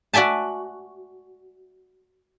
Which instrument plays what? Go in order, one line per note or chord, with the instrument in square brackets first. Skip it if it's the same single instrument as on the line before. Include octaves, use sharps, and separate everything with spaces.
[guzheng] F#4 D5 E5 G#5 A5